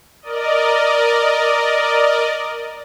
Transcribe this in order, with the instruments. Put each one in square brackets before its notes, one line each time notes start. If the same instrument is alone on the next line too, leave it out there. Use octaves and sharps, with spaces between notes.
[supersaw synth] A#4 D5 D#5